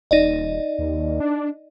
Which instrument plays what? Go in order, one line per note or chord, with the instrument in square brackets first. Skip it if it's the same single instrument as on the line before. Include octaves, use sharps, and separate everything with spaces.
[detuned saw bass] D#1 [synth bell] D#4 D5 D#5
[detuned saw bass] D#2
D4